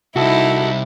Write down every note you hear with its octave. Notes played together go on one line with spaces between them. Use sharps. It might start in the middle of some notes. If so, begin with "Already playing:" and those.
C2 D#4 E4 F#4 A4